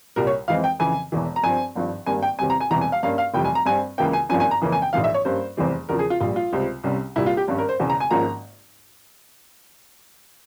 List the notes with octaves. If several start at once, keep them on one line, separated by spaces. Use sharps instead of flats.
C2 A#2 G3 A#4
C#5
F2 E3 G#3 C4 F5
G5
F2 C#3 E3 G#5
E1 E2 E3
A#5
G2 F3 C4 G#5
G#1 G2 F3
G#1 G2 G3 A#3 G#5
G5
E2 C3 G3 C4 G#5
A#5
G#5
E1 E2 C3 E3 G3 A#5
G#5
F5
G2 G3 A#3 C#4 F5
F5
F1 F2 E3 G3 G5
G#5
A#5
G2 G3 C4 G#5
C#2 C#3 E3 A#3 G5
G#5
G#1 G2 F3 A#3 C#4 G#5
G#5
A#5
F2 C#3 E3 A#3 C#4
G#5
G5
A#1 G#2 E3 F5
E5
C#5
G2 G3 A#3 C#4 C5
F1 E2 E3 G3 C4
E2 C#3 F3 A#4
G#4
F4
A#1 A#2 G3 F4
F4
C#2 C3 G3 C4
C2 C3 G3 C#4
C2 A#2 G3 E4
F4
G4
G#1 G2 G3 C#4
A#4
C5
E1 E2 C#3
A#5
G#5
G#1 G#2 F3 A#3 C#4 A#5